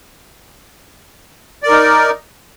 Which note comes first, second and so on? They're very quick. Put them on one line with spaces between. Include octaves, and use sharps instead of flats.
D5 A#4 D#4